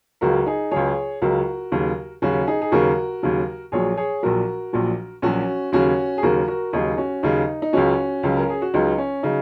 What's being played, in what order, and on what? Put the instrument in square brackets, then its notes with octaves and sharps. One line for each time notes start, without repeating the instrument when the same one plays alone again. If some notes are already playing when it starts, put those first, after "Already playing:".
[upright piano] C#2 C#3 F#3 F#4 A#4
D#4 G#4
C#2 C#3 F#3 G#4 C#5
C#2 C#3 F#3 F#4 A#4
D#2 C#3 F#3
D#2 C#3 F#3 C#4 F#4
D#4 G#4
G#4
D#2 C#3 F#3 F#4 A#4
D#2 C#3 F#3
A#1 A#2 F#3 G#4 C#5
G#4 C#5
A#1 A#2 F#3 F#4 A#4
A#1 A#2 F#3
A#1 A#2 F#3 C#4 F#4
D#2 C#3 F#3 C#4 F#4
G#4
D#2 C#3 F#3 F#4 A#4
F#4 A#4
D#2 C#3 F#3 D#4 G#4
C#4 F#4
D#2 C#3 F#3 D#4
D#4
C#2 C#3 F#3 C#4 F#4
C#2 C#3 F#3
A#4
G#4
F#4
C#2 C#3 F#3 D#4
C#4
C#3 F#3 D#4